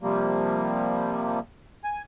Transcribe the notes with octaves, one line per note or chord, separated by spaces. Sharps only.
C3 F3 G3 A#3
G#5